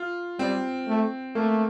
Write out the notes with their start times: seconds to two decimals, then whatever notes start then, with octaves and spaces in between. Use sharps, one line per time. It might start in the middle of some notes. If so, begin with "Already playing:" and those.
Already playing: F4
0.39 G3 C4
0.88 A3
1.35 A3 A#3